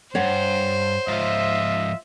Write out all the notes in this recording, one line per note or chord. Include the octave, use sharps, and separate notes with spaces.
G2 C5 C#5 F#5
G#2 F3 F4 D#5 E5